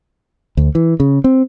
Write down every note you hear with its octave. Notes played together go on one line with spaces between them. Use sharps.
D2
E3
C#3
C4